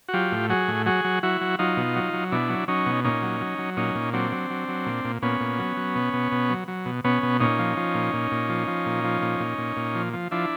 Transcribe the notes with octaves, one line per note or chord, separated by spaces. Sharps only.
F#4
F#3 F4 G4
A2
F#3 F#4 G#4
A2
F#3 F#4 G#4
F#3
F#3 E4 F#4
F#3
F#3 D#4 F4
B2
F#3
F#3
B2 D4 E4
F#3
F#3 C#4 D#4
B2
A#2 C#4 D#4
F#3
F#3
F#3
A#2 C#4 D#4
A#2
F#3 C4 D4
F#3
F#3
F#3
A#2
A#2
A#2 B3 C#4
A#2
F#3
F#3
B2
B2
B2
F#3
F#3
B2
B2 B3 C#4
B2
A#2 C#4 D#4
F3
F3
A#2
A#2
A#2
F3
F3
A#2
F3
A#2
A#2
A#2
A#2
F3
F3
F3 D4 E4